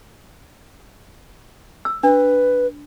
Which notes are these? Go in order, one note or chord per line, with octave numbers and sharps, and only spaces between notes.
E6
D4 B4